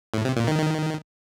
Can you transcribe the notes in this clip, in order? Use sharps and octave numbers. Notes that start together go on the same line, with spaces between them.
A2
C3
A#2
D#3
D#3